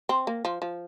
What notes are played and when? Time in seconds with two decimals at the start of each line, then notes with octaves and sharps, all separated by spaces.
0.09 C4
0.27 A#3
0.45 F3
0.62 F3